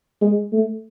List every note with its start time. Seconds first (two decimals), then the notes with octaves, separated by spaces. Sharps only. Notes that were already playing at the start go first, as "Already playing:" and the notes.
0.22 G#3
0.52 A3